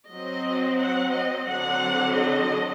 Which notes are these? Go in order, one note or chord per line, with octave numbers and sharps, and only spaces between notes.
F#3 C4 D#5
F#5
D#5
D3 F#3 C4 F#5
D#5